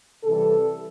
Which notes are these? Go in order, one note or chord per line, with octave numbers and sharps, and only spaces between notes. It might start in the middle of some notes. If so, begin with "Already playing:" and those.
C3 E3 G3 A4